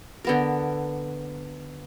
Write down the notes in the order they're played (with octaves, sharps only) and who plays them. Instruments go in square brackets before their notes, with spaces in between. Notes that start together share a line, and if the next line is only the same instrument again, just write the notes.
[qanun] D3 B3 A#4